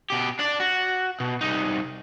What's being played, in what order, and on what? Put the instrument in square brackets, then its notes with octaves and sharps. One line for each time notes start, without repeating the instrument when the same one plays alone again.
[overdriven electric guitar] B2 G4
D4 D5
F#4
B2
C2 D#4